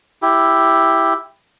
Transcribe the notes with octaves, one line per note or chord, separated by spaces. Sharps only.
E4 G4